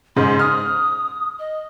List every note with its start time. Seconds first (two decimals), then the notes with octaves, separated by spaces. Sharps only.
0.16 G#2 C#3 C6
0.39 D#6 F6
1.39 D#5